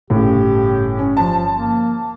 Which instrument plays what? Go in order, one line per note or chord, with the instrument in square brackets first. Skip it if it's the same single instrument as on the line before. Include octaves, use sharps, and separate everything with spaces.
[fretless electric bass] G1 [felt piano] A2 C#3 [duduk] G4
[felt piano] C#4
[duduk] F3 [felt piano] A5
[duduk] A#3